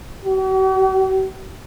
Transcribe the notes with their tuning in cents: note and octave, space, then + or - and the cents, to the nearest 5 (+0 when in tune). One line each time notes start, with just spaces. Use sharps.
F#4 +45